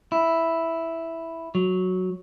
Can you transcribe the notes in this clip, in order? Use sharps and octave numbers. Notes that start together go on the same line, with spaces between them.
E4
F#3